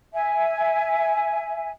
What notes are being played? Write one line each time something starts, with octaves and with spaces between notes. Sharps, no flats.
E5 G#5